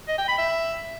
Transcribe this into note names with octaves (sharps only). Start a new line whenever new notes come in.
D#5
G5
B5
E5